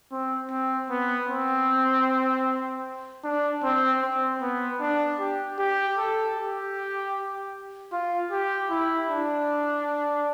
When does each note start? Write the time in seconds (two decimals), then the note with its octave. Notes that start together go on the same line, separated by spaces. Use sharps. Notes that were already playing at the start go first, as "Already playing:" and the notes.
0.12 C4
0.51 C4
0.90 B3
1.29 C4
3.24 D4
3.63 C4
4.02 C4
4.41 B3
4.80 D4
5.20 G4
5.59 G4
5.98 A4
6.36 G4
7.93 F4
8.32 G4
8.70 E4
9.10 D4